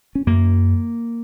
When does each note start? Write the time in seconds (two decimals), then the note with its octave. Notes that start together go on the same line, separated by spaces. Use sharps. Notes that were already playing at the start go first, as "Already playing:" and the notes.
0.15 C#4
0.27 F#2 A#3